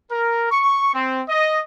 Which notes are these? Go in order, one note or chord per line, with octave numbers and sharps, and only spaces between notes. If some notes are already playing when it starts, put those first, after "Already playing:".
A#4
C#6
C4
D#5